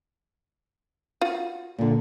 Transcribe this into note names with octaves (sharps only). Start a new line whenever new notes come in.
F4 F#4
A#2 D3